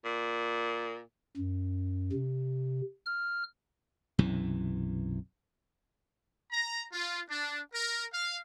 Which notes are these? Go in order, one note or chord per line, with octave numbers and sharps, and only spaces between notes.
A#2
F#2
C3
F6
B1 F#2 C3 E3
A#5
F4
D4
A#4
F5